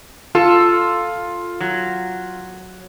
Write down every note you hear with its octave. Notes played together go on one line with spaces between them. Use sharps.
F4 A4
F#3